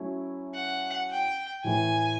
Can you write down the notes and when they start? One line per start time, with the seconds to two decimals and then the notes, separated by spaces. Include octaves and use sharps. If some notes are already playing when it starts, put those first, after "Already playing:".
Already playing: F#3 A3 C#4 E4
0.54 F#5
1.10 G5
1.64 A2 E3 A3 G#5